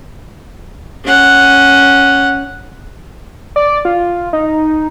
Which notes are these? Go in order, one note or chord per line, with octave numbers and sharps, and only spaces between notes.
C#4 F#5
D5
F4
D#4